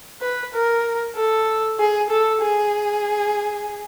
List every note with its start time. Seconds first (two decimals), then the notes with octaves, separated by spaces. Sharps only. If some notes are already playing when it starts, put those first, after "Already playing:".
0.21 B4
0.54 A#4
1.16 A4
1.79 G#4
2.10 A4
2.42 G#4